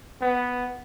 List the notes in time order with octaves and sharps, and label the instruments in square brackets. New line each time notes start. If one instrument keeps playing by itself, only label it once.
[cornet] B3